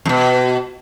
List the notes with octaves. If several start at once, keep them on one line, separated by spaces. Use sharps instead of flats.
F2 B2